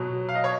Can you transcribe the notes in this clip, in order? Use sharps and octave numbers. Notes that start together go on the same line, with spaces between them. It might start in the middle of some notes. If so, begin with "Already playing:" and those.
Already playing: B2 F#3
F5
D#5
C#5